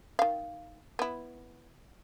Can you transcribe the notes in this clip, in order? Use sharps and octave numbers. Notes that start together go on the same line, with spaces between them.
D#3 F5
B3 E4